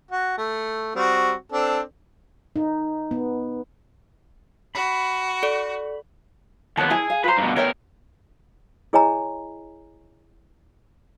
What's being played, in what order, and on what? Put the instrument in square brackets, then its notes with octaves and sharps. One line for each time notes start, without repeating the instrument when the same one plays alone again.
[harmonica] F#4
A3
G3 C4 F#4
C4 D4 A4
[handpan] D#4
B3
[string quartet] F#4 [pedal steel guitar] B5
[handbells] A4 D5
[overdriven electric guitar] D#2 B3 [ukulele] C#5 A5
[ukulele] E4 G#5 A5 [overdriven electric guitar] G#4
[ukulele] F5
[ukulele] F4 A#5 [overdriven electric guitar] B4 C5
[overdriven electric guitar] G2 B2
[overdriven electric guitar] E2 A#4 [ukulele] C#5 E5 G5
[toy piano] E4 G#4 C#5 D#5 G#5 A#5